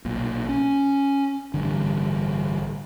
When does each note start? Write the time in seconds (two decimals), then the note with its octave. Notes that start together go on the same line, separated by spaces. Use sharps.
0.05 B1 A#2
0.49 C#4
1.54 A1 G2 D3